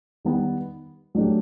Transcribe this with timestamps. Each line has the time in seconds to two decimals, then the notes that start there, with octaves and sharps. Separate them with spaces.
0.25 D#3 G3 B3
1.15 F#3 A3 D4 G4